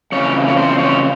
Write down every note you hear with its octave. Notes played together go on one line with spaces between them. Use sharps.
F2 C#3 E3 C#5
C#5
C5
C#5